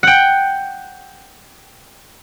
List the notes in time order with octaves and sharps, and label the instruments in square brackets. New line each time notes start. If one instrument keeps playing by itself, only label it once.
[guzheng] F#5 G5